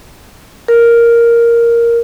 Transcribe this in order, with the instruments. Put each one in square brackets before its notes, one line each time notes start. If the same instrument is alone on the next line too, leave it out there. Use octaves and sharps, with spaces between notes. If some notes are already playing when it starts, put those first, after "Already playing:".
[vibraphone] A#4